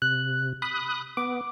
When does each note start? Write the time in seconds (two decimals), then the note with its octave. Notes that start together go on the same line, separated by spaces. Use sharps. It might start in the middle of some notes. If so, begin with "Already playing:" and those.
0.02 C3 F#6
0.62 B5 D#6 F#6
1.17 B3 D6